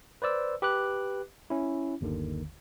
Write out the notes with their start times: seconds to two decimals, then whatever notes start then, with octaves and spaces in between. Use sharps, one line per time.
0.22 B4 C5 D5 E6
0.62 G4 B4 D6 F#6
1.50 C#4 E4
2.01 G1 D#2 D3 D#3